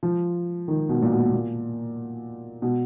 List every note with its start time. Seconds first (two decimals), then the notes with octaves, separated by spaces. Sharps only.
0.03 F3
0.68 D#3
0.89 B2
1.02 A#2
1.11 B2
1.33 A#2
2.62 B2